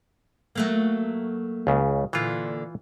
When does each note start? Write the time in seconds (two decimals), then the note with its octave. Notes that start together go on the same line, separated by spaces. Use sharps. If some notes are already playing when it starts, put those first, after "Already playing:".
0.55 F#3 A3 A#3
1.67 C#2 C#3
2.13 A#2 D3 E3 F4